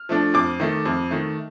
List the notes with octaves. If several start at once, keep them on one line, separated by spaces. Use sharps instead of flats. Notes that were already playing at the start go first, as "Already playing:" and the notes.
Already playing: F6
F3 A3 D4
F2 D6
D#3 A3
F2
D#3 A3